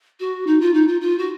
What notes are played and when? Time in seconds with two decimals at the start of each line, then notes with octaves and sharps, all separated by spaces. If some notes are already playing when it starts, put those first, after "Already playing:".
0.20 F#4
0.46 D#4
0.61 F4
0.74 D#4
0.88 F4
1.01 F4
1.18 F#4